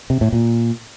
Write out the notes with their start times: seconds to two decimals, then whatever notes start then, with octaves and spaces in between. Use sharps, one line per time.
0.10 C3
0.21 A2
0.32 A#2